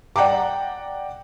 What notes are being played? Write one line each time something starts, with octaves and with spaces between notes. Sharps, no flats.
D5 F#5 G5 A#5 D6